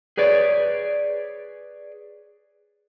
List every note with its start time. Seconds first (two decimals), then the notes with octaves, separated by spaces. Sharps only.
0.17 G#4 B4 C#5 D5